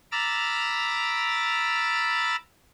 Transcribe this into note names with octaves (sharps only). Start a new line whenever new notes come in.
A#5 B5 D6 E6 F6 A6